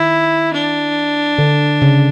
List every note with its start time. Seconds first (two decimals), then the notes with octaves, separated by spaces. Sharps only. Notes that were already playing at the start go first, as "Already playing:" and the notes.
Already playing: D#3 E4
0.53 D4
1.38 D3
1.82 C#3